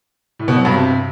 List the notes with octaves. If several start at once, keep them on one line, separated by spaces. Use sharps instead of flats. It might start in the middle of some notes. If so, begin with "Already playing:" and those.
A2
B2
F#3
G2
C3